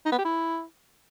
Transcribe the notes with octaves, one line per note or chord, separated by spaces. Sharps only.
D#4
B3
G4
E4